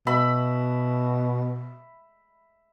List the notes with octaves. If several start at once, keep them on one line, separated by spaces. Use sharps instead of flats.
B2 E5 B5